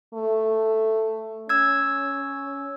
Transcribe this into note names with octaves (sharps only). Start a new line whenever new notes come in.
A3
C#4 E6 G#6